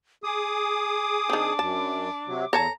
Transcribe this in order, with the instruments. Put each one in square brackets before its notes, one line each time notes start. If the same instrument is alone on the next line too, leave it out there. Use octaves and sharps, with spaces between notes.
[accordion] G#4 D#6 [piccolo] D6
[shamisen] D#3 C4 [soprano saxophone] D4
[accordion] F#2 [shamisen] A5
[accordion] C3 F#3
[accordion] E2 [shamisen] A4 C#5 A5 [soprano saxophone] A#5